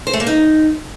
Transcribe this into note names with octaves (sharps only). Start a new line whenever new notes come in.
C5
A3
A#3
D#4